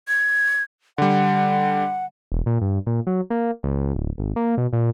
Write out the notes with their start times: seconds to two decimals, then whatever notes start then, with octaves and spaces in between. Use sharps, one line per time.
0.08 G#6
0.98 D3 G3 F#5
2.32 E1
2.46 A#2
2.61 G2
2.87 A#2
3.07 F#3
3.30 A#3
3.63 C#2
3.96 D1
4.18 G#1
4.36 A#3
4.58 B2
4.73 A#2